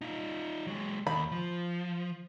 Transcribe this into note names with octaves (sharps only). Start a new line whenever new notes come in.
D#4 F4
F#3 G#3
D#2 B5
F3